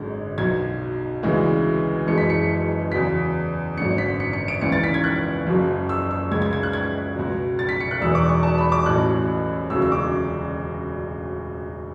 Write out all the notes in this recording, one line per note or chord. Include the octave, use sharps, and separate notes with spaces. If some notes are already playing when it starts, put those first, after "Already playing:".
Already playing: G#1 F#2 D3 G#3
B1 B2 F#3 G#6
D2 C#3 E3 G#3
F#1 F#2 E3 G#3 C#7
B6
C#7
E2 C#3 F#3 B6
G#1 F#2 D3 C#7
B6
C#7
C#7
D7
C#2 C#3 E3 C#7
A6
B6
G#6
F#6
F#1 F#2 C#3 F#3
E6
E6
C#2 C#3 G#3 G#6
G#6
G#6
F#6
G#6
C#2 B2 F#3
A6
B6
C#7
F#6
E1 E2 B2 F#3 E6
D6
C#6
A5
B5
D6
A1 A2 F#3 F#6
E1 D2 C#3 F#3 E6
E6
D6